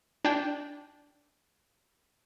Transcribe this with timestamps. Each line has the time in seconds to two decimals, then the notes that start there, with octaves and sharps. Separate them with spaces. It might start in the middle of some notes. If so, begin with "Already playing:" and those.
0.25 D4 G5